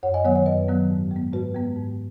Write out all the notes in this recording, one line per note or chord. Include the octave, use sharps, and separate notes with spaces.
F#2 C#5 F#5
D#5 G#5
D#3 F#3 B3 C#5 F#5
C#5 F#5
F#2 B4 D#5
D#3 F#3 B3
G#2
G#3 B3
G#2 F#4 B4
G#3 B3
G#2